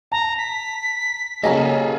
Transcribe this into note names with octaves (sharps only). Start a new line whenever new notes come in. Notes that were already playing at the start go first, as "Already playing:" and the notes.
A5 A#5
B6
C#3 F#3 A#3 G#4 A4 D#5 A5